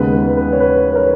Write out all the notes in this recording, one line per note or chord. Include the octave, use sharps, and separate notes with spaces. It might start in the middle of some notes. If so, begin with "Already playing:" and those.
Already playing: D#2 C#3 G#3 B3 B4
B4
B4
C#5
B4
B4
A#4 C#5